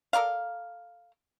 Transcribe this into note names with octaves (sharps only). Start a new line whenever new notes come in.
A4 A#4 D5 F5